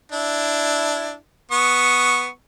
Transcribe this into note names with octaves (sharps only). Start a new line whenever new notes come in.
D4 E4
B3 C#6 D#6